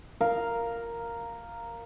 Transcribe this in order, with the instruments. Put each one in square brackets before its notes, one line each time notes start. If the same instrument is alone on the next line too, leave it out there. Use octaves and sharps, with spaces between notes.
[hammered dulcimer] A#4 F5